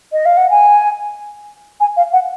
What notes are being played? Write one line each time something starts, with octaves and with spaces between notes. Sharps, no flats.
D#5
F5
F#5
G#5
G#5
F5
F#5